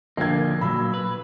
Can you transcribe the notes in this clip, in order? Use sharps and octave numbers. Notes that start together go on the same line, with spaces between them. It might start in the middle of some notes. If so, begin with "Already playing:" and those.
A#1 D3 A#3 G#6
A#2 F#3 B5 E6
B4